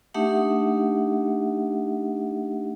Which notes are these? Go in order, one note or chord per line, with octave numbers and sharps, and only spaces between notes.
A3 D4 D#4 G4 E5 F#5